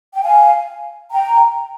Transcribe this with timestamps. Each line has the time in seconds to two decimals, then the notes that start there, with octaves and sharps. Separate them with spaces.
0.14 G5
0.23 F5 G#5
1.11 G5 A#5